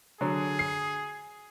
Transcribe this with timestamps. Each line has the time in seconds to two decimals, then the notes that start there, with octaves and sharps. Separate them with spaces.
0.21 D3 F#3 G#4
0.59 C7